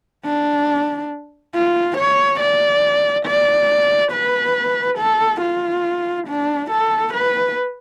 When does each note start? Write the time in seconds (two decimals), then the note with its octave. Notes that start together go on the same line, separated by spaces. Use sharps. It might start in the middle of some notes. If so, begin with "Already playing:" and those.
0.25 D4
1.54 F4
1.98 C#5
2.40 D5
3.26 D5
4.12 B4
4.99 A4
5.42 F4
6.28 D4
6.71 A4
7.14 B4